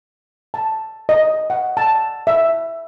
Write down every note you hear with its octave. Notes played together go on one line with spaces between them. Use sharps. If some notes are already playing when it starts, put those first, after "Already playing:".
A5
D#5
F#5
A5
E5